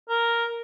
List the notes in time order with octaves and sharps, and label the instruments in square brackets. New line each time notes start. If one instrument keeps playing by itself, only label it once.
[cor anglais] A#4